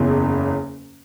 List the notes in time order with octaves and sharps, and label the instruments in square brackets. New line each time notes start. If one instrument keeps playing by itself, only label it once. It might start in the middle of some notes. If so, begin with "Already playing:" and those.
Already playing: [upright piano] F#1 E2 C#3